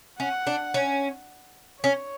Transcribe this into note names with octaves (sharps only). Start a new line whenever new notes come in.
C#4 F#5
D4
C#4
C#4 C#5